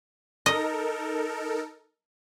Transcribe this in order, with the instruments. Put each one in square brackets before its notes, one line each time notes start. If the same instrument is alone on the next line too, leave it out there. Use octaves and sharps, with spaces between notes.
[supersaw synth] D#4 A4 A#4 [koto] D#5